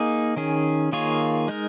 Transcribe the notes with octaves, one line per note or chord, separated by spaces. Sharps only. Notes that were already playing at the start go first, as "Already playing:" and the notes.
Already playing: A#3 D#4 G#4
D#3 C#4 G#4
D#3 A#3 F4 G#4 C#5
G#3 D#4 A#4